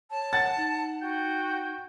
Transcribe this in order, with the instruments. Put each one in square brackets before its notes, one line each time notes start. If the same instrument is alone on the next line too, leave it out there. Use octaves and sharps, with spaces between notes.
[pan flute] C#5 [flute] A5
[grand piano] F#5 A6
[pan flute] D#4
[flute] F#4 [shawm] G5